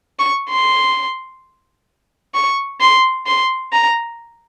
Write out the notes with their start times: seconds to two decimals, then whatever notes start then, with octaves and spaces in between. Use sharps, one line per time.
0.19 C#6
0.50 C6
2.34 C#6
2.81 C6
3.27 C6
3.73 A#5